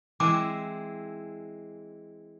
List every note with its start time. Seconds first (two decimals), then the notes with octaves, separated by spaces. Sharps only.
0.20 E3 G#3 C4 D6